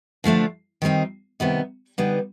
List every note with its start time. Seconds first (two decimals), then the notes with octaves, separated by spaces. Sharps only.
0.24 D3 F3 A3 D4
0.82 D#3 G3 C4 D#4
1.40 C3 D#3 G3 B3 D#4
1.98 D3 G3 B3 D#4